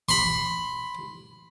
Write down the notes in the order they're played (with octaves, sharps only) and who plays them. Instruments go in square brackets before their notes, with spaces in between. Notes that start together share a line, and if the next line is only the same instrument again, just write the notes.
[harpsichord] B5 C6